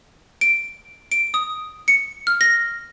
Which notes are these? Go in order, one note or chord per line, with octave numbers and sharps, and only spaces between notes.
D7
D7
D#6
C#7
F6
A#6